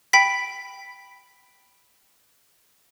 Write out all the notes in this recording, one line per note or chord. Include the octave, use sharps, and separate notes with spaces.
G5 B5 B6